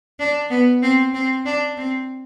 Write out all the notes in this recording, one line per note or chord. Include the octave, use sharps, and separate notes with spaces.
D4
B3
C4
C4
D4
C4